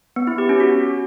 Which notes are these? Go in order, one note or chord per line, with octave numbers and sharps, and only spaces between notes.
B3
E4
G4
C#4
F#4